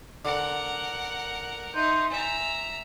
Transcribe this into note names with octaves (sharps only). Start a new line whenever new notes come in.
D3 A#4 F#5
D#4 E5 C6 G6
E5 G#5 A#5